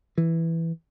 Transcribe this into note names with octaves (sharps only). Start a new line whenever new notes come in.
E3